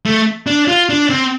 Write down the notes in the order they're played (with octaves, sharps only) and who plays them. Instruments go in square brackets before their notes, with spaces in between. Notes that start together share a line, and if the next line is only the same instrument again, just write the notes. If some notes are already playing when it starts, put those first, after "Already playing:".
[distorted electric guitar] A3
D4
F4
D4
C4